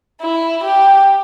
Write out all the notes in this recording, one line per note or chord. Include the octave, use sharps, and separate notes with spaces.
E4
G4